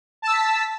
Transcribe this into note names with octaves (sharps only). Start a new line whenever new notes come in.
A5 E6 B6